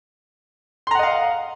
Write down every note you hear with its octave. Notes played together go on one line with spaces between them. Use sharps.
D#5 F5 F#5 A#5 C6